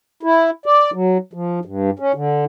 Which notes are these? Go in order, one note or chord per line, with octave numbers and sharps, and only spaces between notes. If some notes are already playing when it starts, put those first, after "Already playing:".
E4
D5
F#3
F3
G2
C#4
D3